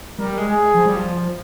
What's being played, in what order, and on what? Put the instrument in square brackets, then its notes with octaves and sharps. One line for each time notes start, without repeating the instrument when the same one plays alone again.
[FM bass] G3 [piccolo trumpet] A#4
[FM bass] G#3
[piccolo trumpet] G#4
[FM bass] F3
G3
F3